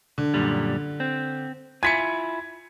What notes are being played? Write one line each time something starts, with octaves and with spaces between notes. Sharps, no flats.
D3
F#2 A#2 G3
C4
E4 F4 G#5 G#6 B6 C#7